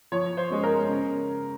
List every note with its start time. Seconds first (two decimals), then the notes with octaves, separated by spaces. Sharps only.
0.12 F3 C#5
0.37 C5
0.50 G#3 C#4
0.63 A#4
0.89 C#3